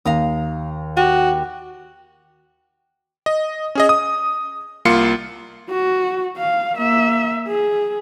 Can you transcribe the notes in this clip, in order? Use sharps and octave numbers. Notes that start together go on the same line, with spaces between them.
D#2 F5 A#5 D#6
F#4 G4
D#5
C#4 G#4 D#5
D#6
C2 A#3 F4 C6 C7 C#7
F#4
F5
A#3 E5
G#4